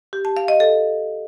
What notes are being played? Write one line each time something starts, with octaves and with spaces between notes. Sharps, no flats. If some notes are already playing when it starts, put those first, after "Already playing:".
G4
A5
F5
D#5
A4